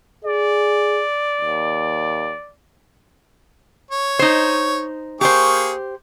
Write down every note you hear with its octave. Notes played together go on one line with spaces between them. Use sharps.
G#4 D5
D#2
C#5
D#4 C5
A#3 G4 G#4 C5 C#6